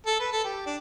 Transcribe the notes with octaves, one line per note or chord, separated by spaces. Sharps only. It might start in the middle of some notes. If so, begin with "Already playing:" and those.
A4
B4
A4
G4
D4